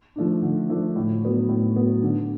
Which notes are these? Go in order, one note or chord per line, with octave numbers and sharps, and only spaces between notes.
F3 A3 D4
D3
F3 A3 D4
A2
F#3 B3
A2
F#3 B3
D3